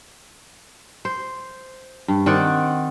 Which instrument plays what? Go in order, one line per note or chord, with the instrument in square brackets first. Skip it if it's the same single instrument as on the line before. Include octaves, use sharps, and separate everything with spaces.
[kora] C5
G2
D#3 C4 D5 F#5